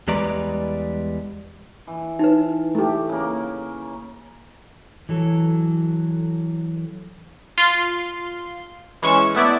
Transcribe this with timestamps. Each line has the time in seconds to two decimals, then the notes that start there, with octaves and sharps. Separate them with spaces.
0.08 E2 G3 G#3 B4 D5 A#5
1.87 E3
2.19 D#4 B4
2.75 A3 G4
3.09 C#3 A#3
5.09 E3 F#3 A4
7.58 F4 C6
9.02 E3 G#3 C#4 C#6 E7
9.35 A3 B3 E4 D5